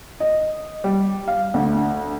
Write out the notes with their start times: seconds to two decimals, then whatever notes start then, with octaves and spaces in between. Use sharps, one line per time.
0.20 D#5
0.84 G3
1.28 F5
1.54 D2